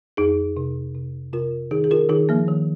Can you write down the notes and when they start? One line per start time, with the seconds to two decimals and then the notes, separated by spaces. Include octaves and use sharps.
0.17 F2 D#4 G#4
0.57 C3
0.95 C3
1.33 C3 F4 A#4
1.71 D#3 D#4 G#4
1.84 G#4
1.91 F4 A#4
2.09 D#3 D#4 G#4
2.29 F3 A#3
2.48 D#3